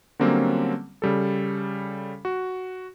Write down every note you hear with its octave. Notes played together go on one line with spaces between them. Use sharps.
D3 F#3 G3 A#3 C4 C#4
C#3 G3 A4
F#4